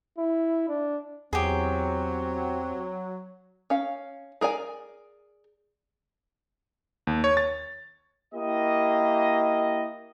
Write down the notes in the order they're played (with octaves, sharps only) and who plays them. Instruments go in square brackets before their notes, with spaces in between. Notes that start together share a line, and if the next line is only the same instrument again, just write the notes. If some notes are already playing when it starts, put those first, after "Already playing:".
[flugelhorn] E4
D4
[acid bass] E2 [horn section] F#3 [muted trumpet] C4 [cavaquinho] G4 G#4
[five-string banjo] C#4 F5
G#4 A#4 D5 G#5
[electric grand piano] D#2
C#5
A6
[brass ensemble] A#3 E4 G4 D#5